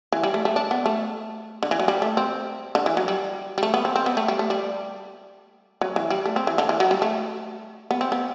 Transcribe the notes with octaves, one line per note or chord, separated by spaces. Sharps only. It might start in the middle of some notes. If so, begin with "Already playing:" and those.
E3
G3
A3
A3
D4
B3
A3
D3
E3
F#3
G3
A3
C4
D3
E3
F#3
G3
G3
A3
B3
C4
C4
B3
A3
G3
A3
G3
F#3
E3
G3
A3
C4
E3
D3
E3
F#3
G3
A3
B3
C4
B3